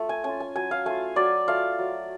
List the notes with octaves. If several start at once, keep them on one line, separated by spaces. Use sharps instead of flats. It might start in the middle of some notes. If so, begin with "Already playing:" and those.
Already playing: A3 F4
G#5
C#4 F4 G#5
G#5
F#3 G#5
F5
A3 F4 G#5
F#3 D5
A3 F4 F5
F#3